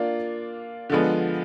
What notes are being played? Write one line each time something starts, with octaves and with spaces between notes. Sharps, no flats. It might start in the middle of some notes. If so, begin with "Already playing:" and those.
Already playing: A#3 D4 F4
D3 F3 G#3 B3